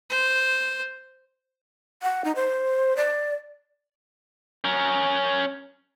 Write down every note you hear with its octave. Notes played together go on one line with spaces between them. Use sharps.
C5
F#5
D#4
C5
D5
C#4 A#4